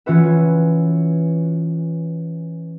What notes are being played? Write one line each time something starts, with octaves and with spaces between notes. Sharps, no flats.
E3 C#4 F4 F#4 B4 E5